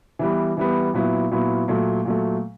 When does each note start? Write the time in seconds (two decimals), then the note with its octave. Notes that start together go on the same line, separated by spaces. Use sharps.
0.19 E3 G3 B3
0.57 E3 G3 B3
0.94 A#2 F#3 B3 E4
1.31 A#2 F#3 B3 E4
1.68 A#2 F#3 A3
2.05 A#2 F#3 A3